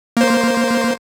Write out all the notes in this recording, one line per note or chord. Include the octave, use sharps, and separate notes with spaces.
A#3 C5